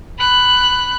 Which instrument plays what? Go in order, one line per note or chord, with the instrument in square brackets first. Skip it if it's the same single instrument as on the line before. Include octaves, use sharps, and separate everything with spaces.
[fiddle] B5 F#6